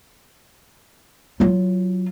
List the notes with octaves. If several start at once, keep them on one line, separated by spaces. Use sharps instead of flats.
F#3 F4